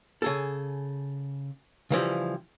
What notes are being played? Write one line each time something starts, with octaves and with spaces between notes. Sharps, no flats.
C#3 G#4 A4
C#3 E3 F3 G3